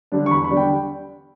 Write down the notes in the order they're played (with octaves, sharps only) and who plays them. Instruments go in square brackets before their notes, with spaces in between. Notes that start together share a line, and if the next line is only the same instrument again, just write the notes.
[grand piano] D3 G3 D4
C#6
E2 B5
B5
D3 G3 D4
G5